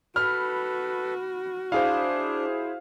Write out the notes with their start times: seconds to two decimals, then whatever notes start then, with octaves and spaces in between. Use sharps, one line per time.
0.16 F#4 A4 B4 B5 F6
1.72 D4 E4 G#4 C5 F5